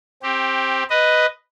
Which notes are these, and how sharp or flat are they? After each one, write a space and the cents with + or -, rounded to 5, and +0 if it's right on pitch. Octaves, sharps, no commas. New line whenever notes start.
C4 +15 G4 +0
B4 +0 D#5 +0